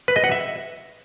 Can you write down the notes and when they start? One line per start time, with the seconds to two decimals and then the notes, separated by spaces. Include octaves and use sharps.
0.08 B4
0.16 D#5
0.24 F#5
0.32 E5